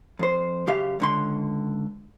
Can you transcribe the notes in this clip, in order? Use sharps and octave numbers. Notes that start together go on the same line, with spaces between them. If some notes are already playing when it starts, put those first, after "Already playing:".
F2 C5
F#2 C#3 G4 E5 F5
C#2 D3 C6